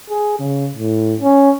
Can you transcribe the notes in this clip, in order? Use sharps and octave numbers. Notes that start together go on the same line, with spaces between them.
G#4
C#3
A2
C#4